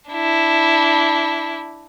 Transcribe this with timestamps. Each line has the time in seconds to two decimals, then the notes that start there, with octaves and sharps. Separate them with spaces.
0.11 D4 E4